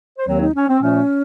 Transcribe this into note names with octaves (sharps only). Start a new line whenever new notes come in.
C5
D#2 D#3 F#3 C4 C#5
D#4
C#4
C4
A#2 F3 A3 C#4